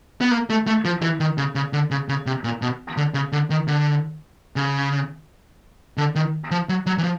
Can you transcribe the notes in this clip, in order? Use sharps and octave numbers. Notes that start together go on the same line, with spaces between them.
B3
A#3
A3
A3
F3
E3
D#3
C#3
C#3
D3
C#3
C#3
C3
A#2
B2
D3
C#3
D3
D#3
D3
C#3
D3
D#3
F3
F#3
F#3
E3
F3